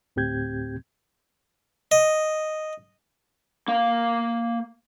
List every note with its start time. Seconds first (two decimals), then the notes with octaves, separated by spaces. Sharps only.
0.16 D2 A2 C4 G4 G6 G#6
1.91 D#5
3.68 A#3 F5